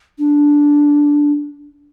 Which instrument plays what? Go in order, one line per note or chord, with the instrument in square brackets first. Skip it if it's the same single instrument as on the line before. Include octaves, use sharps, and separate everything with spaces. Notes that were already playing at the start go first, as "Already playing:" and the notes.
[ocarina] D4